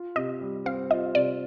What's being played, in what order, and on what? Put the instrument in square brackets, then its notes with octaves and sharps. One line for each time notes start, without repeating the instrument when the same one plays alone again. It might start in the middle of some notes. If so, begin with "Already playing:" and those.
Already playing: [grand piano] F4
[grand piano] C3 [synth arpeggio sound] D#5
[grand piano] G3
[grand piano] C4 [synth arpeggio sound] F5
[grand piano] F4 [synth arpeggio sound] D#5
[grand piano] C3 [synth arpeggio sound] D5